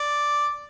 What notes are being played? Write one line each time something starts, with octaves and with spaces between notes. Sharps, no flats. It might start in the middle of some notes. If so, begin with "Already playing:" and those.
Already playing: D5